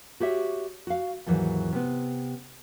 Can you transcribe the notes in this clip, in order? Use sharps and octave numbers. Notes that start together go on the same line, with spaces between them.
F#4 G4 C#5 E5
F#4 F5
D#2 G#2 E3 F#3
C3 B3